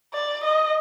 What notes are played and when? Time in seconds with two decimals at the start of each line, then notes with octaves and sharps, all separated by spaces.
0.14 D5
0.44 D#5